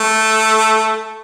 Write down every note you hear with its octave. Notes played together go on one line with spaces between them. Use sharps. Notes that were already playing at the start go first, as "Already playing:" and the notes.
Already playing: A3